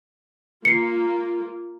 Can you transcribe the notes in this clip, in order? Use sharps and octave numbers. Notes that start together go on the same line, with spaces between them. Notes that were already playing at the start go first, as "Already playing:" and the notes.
A#3 F4 C7 C#7